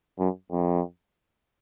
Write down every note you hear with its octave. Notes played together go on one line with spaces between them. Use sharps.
F#2
F2